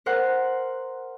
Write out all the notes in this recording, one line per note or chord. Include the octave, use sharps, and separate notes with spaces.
A#4 C5 F#5